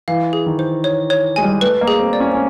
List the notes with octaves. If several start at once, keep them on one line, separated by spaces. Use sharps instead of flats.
E3 F5
G#4
D#3
C5
C#5
C#5
G#3 G#5
G3
A3 B4
A#3
G#4
C4
D5
C#4
C#4